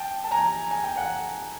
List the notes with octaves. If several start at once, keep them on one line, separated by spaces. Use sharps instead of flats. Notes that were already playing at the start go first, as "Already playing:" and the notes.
Already playing: G5 A5
A5
G#5 A#5
G#5
G5
F#5 G#5